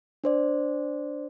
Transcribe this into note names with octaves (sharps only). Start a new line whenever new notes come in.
D4 C5 D5